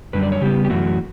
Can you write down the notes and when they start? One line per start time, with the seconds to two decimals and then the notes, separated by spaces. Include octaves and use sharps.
0.13 F#2 D3 G3 B4
0.23 D5
0.32 C#5
0.41 C#3 G3 B3 G4
0.65 G4
0.70 F#2 E3 A3 F#4